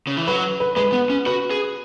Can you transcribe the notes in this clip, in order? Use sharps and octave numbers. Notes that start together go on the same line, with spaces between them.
C#3
E3
F#3 B4
B4
G#3 B4
B3
C#4
F#4 B4
G#4